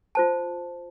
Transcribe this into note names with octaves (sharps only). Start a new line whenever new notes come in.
F4 C5 A5